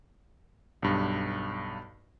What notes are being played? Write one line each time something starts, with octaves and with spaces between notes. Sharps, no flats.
B1 G2